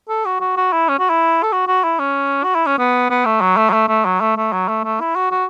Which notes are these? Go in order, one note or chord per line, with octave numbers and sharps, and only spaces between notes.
A4
F#4
F#4
F#4
E4
C#4
F#4
E4
A4
F#4
F#4
E4
C#4
F#4
E4
C#4
B3
B3
A3
F#3
A3
F#3
A3
A3
F#3
A3
A3
F#3
A3
A3
E4
F#4
F#4